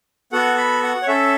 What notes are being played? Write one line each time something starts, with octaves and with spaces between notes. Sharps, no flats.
B3 F#4 A4 F#5
B5
F#5
C#5
C#4 A4 E5